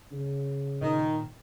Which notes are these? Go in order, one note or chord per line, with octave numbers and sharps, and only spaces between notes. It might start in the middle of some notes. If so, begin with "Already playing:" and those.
C#3
A#2 D#3